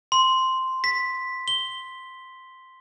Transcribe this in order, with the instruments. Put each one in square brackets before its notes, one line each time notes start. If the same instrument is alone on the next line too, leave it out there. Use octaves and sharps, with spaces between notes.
[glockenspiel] C6
B6
G7